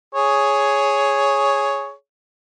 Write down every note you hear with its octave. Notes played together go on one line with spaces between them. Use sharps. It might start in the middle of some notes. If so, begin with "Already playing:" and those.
G#4 C#5